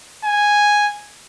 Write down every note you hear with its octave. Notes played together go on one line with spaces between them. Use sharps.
G#5